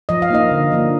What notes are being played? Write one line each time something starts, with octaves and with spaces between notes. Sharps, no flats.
F3 D#5
F5
A#3 D#4 D#5
D3
F3 A#3 D4